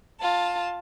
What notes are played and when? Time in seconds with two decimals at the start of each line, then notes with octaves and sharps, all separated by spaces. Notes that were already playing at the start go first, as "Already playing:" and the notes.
0.20 F4 A5